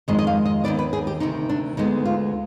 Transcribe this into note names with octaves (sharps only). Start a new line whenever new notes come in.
F2 D#3 G#3 D#5
D#5
F5
D#5
D#2 D#3 B3 D5
B4
G#4
G4
D2 C3 D#3 D#4
D4
D2 D3 G#3 B3 D#4
F4